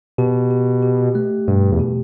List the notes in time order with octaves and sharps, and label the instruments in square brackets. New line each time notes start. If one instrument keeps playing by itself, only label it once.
[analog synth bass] B2 [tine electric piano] G4
[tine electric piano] G4
G4
A3
[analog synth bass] G2 [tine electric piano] B2
[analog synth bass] E2
[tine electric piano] B2